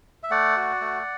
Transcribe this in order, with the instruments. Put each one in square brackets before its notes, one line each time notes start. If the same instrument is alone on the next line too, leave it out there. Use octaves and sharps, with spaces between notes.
[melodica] E5
A3 D5 F#5
F#4
A3